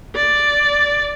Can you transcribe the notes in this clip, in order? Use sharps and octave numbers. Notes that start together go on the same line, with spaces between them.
D5